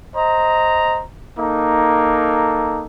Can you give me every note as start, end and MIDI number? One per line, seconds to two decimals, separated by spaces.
0.15 1.02 72
0.15 1.02 75
0.15 1.02 82
1.37 2.86 58
1.37 2.86 63
1.37 2.86 69